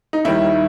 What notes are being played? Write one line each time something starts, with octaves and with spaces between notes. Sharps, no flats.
D#4
D#2 D#3 G3 E4